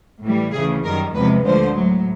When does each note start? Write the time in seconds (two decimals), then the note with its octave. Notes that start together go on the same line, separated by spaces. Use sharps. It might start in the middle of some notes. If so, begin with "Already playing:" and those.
0.24 A2 E3 G3
0.54 D2 C#3 E3 G#4
0.85 F#2 D#3 G3 A#4
1.15 E2 C3 F3 G#3 B4
1.45 D2 D3 F3 G#3 C5
1.75 A2 F#3